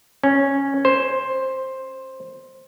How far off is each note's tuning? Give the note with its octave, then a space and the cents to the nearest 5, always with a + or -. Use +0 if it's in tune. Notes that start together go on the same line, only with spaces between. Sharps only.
C#4 -5
C5 +10